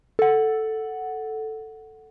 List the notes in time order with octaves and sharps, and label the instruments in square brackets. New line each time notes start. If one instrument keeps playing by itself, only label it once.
[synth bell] A4 F#5